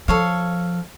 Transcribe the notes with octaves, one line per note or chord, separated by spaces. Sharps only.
F3 A4 C#5 F5